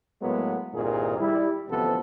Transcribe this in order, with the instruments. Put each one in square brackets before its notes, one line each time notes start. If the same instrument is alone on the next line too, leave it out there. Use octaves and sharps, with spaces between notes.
[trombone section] A2 F#3 G#3 A#3 B3
C2 G2 A#2 D#3 G#4
G3 E4
A1 D2 C3 F3 B3 A4